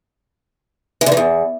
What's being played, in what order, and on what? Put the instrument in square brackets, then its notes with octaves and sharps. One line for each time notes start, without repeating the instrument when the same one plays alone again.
[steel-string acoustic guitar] E3
D3
E3
E2